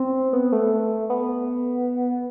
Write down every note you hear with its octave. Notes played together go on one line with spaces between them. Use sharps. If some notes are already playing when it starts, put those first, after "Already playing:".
Already playing: C4
B3
A3
B3